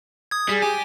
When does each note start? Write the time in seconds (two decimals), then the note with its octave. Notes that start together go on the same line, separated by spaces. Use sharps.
0.31 D#6 G#6
0.49 G3 G#4
0.62 G4 G#5